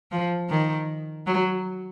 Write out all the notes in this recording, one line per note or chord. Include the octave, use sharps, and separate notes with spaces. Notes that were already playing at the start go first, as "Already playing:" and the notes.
F3
D#3
F#3